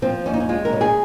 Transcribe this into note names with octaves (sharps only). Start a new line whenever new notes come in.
F3 C4
D#2 C#4
D#4
C#4
G#3 F4
A#4
C#3
G#4